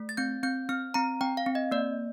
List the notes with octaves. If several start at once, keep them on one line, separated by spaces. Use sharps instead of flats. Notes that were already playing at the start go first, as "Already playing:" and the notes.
Already playing: A3
A6
C4 G6
C4 G6
C4 F6
C4 A#5
C4 G5
F5
C4
D#5
A#3 D5